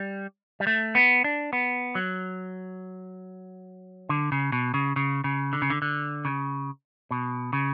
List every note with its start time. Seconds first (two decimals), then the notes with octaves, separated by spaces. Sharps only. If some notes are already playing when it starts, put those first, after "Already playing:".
Already playing: G3
0.60 G3
0.67 A3
0.95 B3
1.24 D4
1.53 B3
1.95 F#3
4.09 D3
4.32 C#3
4.52 B2
4.74 C#3
4.96 C#3
5.24 C#3
5.53 D3
5.62 C#3
5.70 D3
5.82 D3
6.25 C#3
7.11 B2
7.53 C#3